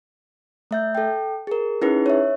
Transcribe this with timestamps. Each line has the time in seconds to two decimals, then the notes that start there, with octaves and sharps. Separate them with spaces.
0.71 A3 E5 G6
0.95 A4 G5
1.47 G#4 A#4
1.82 C#4 D#4 E4 G#4 B4
2.06 C#5 E5